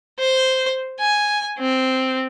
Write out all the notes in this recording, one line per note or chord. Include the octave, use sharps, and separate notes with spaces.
C5
G#5
C4